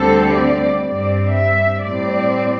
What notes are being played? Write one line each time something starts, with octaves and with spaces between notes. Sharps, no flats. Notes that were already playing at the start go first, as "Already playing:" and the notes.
Already playing: D2 D3 G3 C4 A4
D5
G2 G3 C4 D5
E5
A2 G3 C4 D5